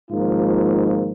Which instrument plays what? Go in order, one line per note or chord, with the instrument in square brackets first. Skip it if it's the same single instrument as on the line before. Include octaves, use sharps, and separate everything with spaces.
[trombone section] G#1 G#2 F3 A#3 F4